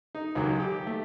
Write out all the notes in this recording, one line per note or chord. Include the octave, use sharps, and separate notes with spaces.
D#4
C#2 D#3 F#3
G4
A3